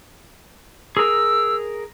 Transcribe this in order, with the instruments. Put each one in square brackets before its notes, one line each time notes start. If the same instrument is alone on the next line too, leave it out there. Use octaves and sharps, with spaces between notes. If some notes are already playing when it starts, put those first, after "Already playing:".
[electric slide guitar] G#4 A#4 [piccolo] E6